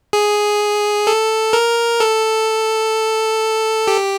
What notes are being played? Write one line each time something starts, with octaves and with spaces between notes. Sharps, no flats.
G#4
A4
A#4
A4
G4